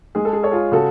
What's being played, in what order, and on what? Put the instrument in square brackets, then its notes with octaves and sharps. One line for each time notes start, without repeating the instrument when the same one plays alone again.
[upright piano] G#3 [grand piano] G#4
[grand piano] A4
G#4
[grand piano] A4 [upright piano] C#5
[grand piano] F4 G#4
[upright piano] C#3 [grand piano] F#4 A4